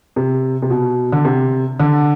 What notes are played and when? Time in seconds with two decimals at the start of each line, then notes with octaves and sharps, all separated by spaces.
0.16 C3
0.62 C3
0.70 B2
1.12 D3
1.25 C3
1.80 D3